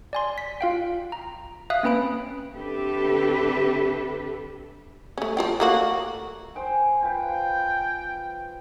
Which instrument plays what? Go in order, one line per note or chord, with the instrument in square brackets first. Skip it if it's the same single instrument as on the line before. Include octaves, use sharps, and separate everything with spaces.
[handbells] D5 G#5 C6
B6
F4 F5 G5
A#5
E5 F5 D#6 F#6
A#3 C4 C#4 B4 B5 D7
[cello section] D3 C4 G4 A4 B4 E5
[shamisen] A3 C#4
F3 F4 G5
A3 A#3 F#4
[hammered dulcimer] C5 G5 G#5
[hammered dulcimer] F4 B4 [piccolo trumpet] G5